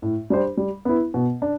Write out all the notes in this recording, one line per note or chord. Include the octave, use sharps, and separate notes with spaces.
A2
G3 D4 G4 C5
G3
B3 E4
B2
D4